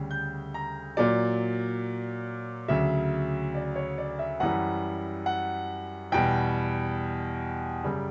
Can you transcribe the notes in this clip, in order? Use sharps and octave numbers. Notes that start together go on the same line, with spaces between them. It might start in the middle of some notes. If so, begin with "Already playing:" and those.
Already playing: D2 C#3 G3
G6
A#5
A#2 F#3 D5
D2 C#3 F#3 E5
D5
C#5
D5
E5
F#2 E3 G3 F#5
F#5
E2 B2 G3 G5
F#2 C#3 G3